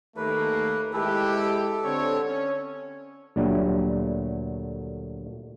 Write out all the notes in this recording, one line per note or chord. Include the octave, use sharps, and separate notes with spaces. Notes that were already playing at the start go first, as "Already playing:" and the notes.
D#2 A3 A#3 B4
G#3 E4 G4 A4 B4
A4
D3 C4 C#5
C#4
D2 A#2 D3 F#3 G3 A3